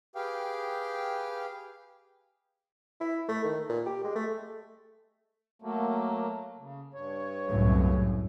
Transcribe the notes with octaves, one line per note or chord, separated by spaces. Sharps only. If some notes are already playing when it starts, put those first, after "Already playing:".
G4 G#4 B4 F5 G5
E4
A3
D#3
A#2
G4
G#3
A3
F#3 A3 A#3
C#3
G2 C#5
C2 F#2 A2